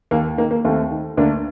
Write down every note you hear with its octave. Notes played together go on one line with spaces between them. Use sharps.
D#2 A#3
D#3 A#3
A#3
D#2 A3 C4
D#3
D2 A#3 D4